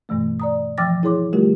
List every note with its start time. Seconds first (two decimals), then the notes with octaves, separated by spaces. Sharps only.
0.09 G2 B2 E3 A3
0.40 D5 A#5 D#6
0.78 E3 F3 G5 D6 A6 A#6
1.03 E4 G#4 C#5 C6 D6
1.33 D3 G3 A3 F4 G4 A#4